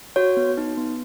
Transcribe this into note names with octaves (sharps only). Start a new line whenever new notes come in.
F#4 C#5
B3
D#4
B3